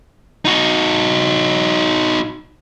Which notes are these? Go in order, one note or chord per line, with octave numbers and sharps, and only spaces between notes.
D#4 F#4